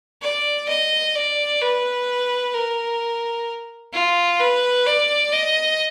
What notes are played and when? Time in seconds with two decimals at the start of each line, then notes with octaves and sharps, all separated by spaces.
0.22 D5
0.68 D#5
1.15 D5
1.61 B4
2.54 A#4
3.93 F4
4.40 B4
4.87 D5
5.33 D#5